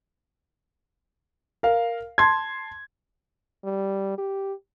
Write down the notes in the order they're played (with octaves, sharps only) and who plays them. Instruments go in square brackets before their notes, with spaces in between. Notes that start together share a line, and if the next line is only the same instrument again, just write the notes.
[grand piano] A#4 F5
A5 C6 G#6
[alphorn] G3
G4